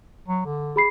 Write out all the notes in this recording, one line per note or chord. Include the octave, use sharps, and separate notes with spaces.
F#3
D3
G#4 B5 C7